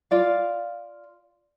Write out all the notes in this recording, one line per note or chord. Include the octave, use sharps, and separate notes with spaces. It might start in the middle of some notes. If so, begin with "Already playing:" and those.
F4 D5 F5